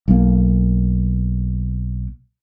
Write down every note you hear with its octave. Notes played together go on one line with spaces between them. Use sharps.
B1 A#3